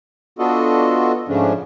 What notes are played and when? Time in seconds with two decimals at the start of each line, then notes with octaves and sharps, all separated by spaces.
0.39 B3 D4 F4 F#4 A4 D#5
1.28 G#2 C#3 F3 A3 C#4 D4